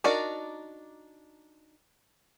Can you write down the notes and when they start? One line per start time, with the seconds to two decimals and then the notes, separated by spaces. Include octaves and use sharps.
0.04 D4 D#4 F#4 A#4 D5